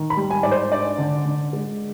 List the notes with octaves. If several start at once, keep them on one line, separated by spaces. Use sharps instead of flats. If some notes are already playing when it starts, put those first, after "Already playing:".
Already playing: D#3
B5
G3
G#5
G#2 D5
C5
D4 D5
D3
D3
G#3